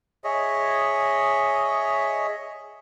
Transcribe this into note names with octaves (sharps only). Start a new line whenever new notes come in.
G#4 C#5 D#5 E5